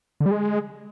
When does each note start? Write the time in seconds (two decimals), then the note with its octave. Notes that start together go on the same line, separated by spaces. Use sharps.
0.20 D3
0.26 G3
0.31 G#3